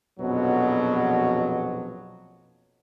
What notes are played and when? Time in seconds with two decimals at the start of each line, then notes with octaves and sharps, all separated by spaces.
0.20 A#1 F2 B2 F#3 B3